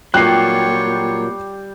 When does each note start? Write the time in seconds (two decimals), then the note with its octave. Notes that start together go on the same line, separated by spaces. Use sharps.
0.14 A#2 F#3 G3 F4 C#5 G5 F#6 C7